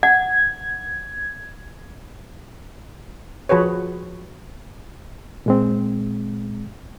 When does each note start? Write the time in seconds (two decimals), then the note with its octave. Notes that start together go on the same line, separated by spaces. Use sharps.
0.03 F#5 G#6
3.49 F3 F#4 G#4 B4 C#5
5.46 A#2 G#3 C4